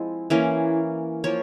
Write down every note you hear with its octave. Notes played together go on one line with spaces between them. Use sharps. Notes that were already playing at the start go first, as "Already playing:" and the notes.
Already playing: F3 G#3 C4 E4
E3 A#3 C#4
F3 A#3 C#5